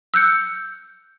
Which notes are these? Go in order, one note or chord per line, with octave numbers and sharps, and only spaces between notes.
E6 F#6 G6 C#7